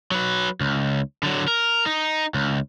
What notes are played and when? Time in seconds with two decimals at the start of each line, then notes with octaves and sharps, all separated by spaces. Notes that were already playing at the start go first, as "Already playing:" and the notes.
0.11 F#3 B4
0.61 C#2
1.23 D3 F#3
1.48 A#4
1.86 D#4
2.34 C#2